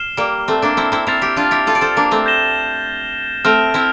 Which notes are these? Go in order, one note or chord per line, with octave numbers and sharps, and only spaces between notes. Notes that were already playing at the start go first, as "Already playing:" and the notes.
Already playing: F6 C7 E7 G7
G3 A#3
A3 C4
A#3 D4
C4 E4
C4 E4
C4 E4 F6 A6 C7 F7
E4 G4
D4 F4
E4 G4
F4 A4
D5
A4 C5
A#3 D4
A3 C4
G6 A#6 E7 G7
A3 C4 F6 A#6 D7 F7
C4 E4